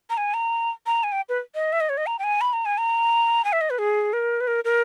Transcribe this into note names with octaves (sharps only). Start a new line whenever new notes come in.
A#5
G#5
A#5
A#5
G#5
G5
B4
D#5
E5
D#5
C#5
D#5
A#5
G5
G#5
B5
A#5
G#5
A#5
G#5
E5
D#5
B4
G#4
A#4
B4
A#4
A#4